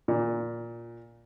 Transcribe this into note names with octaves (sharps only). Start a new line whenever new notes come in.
A#2